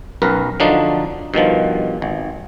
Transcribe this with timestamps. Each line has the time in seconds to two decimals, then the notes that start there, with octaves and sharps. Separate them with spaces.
0.22 B1 F#2 A#4 B4
0.60 D3 F3 F#3 D4 D#4
1.34 G2 B2 D#3 F3
2.02 G#1